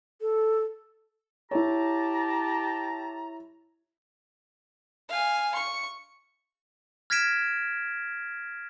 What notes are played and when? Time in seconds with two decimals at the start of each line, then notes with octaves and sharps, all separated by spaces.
0.21 A4
1.51 E4 G4 C#5 A5 A#5
5.09 F5 G#5
5.55 C#6
7.10 F6 G#6 A#6 B6 D7 E7